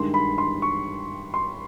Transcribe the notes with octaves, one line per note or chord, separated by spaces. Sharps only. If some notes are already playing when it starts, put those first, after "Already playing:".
Already playing: G2 D#3 G#3 C6
B5
C6
C#6
C6